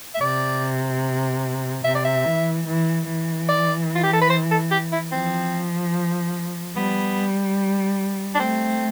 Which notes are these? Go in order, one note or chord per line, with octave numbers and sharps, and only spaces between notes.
E5
C3 D5
C3 E5
D5
E5
E3
E3
E3
D5
F4
G4
A4
B4
C5
A4
G4
E4
F3 C4
G3 B3
D4
A3 C4